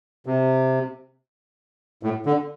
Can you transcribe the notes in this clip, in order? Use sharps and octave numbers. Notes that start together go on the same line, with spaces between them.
C3
A2
D3